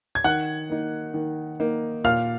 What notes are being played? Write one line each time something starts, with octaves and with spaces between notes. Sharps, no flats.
G#6
D#3 F#5 F#6
A#3 D#4
D#3
A#3 D#4
A#2 F5 F6